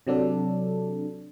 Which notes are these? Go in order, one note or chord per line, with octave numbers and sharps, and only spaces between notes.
C3 F#3 D4 A4